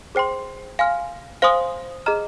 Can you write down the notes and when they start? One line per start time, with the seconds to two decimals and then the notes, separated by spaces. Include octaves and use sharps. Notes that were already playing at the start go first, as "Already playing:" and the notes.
0.15 G#4 C5 G5 C6
0.79 F5 G#5 C6 F6
1.42 C5 F5 G#5 C6 D#6
2.06 G#4 D#5 A#5 F6